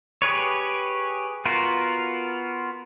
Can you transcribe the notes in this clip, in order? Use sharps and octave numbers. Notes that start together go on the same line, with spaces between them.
G4 G#4 B4 C#5
B3 F4 F#4 A#4